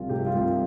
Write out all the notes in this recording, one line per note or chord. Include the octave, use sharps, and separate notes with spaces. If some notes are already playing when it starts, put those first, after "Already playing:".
Already playing: C2 F3 F4
C3 G4
F4
C2